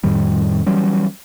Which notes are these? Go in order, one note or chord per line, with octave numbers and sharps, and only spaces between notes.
F2 A2 D#3 G3
E3 F#3 G3 C#4